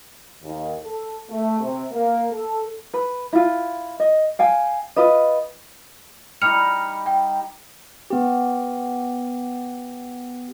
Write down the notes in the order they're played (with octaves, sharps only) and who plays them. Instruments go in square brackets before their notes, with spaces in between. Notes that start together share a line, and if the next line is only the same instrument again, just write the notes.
[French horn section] D#2
A4
A3
C3
A#3
A4
[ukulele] B4
E4 F4
D#5
F5 G5 G#5
F4 B4 D#5
[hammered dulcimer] G3 D#4 [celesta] F6 C#7 F7
[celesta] G5
[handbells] B3 G4